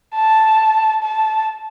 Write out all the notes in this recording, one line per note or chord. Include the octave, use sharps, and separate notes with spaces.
A5
A5